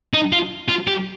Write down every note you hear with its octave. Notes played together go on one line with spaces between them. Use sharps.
D#4
F4
F4
G4